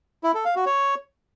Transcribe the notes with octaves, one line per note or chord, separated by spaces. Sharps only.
E4
A4
F5
F#4
C#5